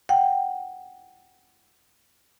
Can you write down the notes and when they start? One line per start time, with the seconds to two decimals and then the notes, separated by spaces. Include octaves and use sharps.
0.09 F#5 G5